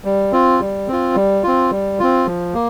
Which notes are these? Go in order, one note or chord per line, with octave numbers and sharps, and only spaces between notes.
G3
C4 F4
G3
C4 F4
G3
C4 F4
G3
C4 F4
F3
A#3